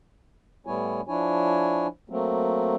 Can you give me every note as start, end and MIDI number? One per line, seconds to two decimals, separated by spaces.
0.66 1.01 45
0.66 1.01 55
0.66 1.01 59
0.66 1.01 64
0.66 1.01 73
0.66 1.01 80
1.08 1.87 53
1.08 1.87 62
1.08 1.87 64
1.08 1.87 73
1.08 1.87 80
2.10 2.76 54
2.10 2.76 57
2.10 2.76 58
2.10 2.76 60